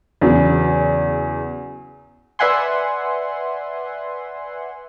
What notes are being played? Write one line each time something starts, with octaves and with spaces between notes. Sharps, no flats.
E2 C#3 F#3
B4 D5 E5 F#5 G#5 C6